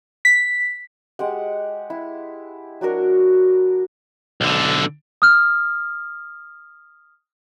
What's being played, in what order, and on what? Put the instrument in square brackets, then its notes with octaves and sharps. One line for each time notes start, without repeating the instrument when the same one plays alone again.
[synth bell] B6
[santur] G#3 G4 F#5
E4
F#3 D4 F#4 A#4
[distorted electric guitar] B1 D3
[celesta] D#6 F6